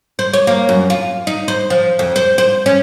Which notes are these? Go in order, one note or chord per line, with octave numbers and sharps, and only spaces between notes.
C5
C#5
A#3
F#2
F4
D#4
C5
F3
F2
C5
C5
C#4